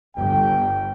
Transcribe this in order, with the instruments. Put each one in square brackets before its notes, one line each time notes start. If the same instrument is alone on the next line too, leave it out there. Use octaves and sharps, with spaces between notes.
[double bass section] G1 [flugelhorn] G5